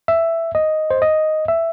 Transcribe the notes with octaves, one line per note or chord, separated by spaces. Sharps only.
E5
D#5
C5
D#5
E5